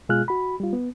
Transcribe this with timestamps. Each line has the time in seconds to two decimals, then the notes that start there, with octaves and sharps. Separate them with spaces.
0.09 B2 G#3 F4 G#4 F6 F#6
0.28 F#4 B5
0.60 G3 F4
0.73 B3